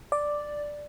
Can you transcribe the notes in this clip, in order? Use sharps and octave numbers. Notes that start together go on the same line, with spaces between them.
D5